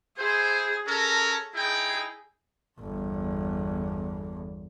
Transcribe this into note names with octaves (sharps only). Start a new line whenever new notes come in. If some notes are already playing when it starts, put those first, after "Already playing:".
E4 G#4 C5
C#4 A4 A#4 A#5
D#4 E4 G#4 G5
G1 E2